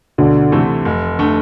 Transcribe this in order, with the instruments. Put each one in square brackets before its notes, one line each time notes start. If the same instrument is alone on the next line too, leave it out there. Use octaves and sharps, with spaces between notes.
[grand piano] D2 [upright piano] B2 D3
[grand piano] C3 E3 A3
F1
D3 A3